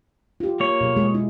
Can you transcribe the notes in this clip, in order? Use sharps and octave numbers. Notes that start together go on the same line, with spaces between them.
F4 G4
A#3 C#5
B2 F#3 G#4
G#3 G#4
E4